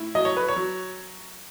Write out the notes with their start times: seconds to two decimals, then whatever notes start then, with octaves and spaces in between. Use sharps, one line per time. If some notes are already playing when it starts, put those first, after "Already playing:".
Already playing: A2 E4
0.15 F#3 D#5
0.25 C#5
0.37 B4
0.49 C#5
0.56 F#3